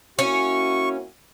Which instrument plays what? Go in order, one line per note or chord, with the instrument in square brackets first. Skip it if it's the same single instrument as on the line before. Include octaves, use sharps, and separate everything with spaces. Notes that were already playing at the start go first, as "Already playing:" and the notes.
[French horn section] A#3 E4 F#4 [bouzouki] C#4 [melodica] C#6